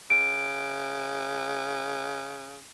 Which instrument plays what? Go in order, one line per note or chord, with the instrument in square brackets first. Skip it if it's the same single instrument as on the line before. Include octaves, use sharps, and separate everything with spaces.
[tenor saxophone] C#3 [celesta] D7